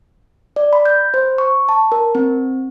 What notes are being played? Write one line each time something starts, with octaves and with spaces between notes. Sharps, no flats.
D5
B5
G6
C5
C#6
A5
A#4
C4